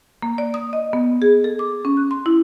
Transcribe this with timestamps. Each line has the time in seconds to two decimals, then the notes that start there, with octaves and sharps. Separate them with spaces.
0.22 A#3
0.38 D5
0.54 D#6
0.73 D#5
0.93 B3
1.22 G#4
1.44 A4
1.59 D6
1.85 C#4
1.97 F#6
2.11 C6
2.26 E4